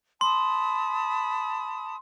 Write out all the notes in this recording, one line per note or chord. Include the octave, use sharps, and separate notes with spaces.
A5 B5 C6 D#6